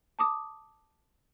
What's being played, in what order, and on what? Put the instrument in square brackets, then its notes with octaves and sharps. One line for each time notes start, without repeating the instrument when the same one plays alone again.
[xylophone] A5 D6 D#6